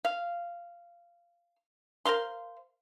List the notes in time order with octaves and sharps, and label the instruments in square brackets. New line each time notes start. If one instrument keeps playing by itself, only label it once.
[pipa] F5
A#4 C5 F5 C6